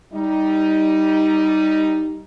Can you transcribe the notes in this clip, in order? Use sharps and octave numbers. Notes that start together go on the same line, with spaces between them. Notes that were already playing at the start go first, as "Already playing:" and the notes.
G3 D#4